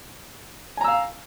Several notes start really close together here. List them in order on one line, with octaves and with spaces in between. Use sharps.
G#5 A#5 E6 F5